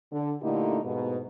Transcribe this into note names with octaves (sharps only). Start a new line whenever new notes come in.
D3
A#2 D3 A3 D#4 E4 G4
G#2 B2 B3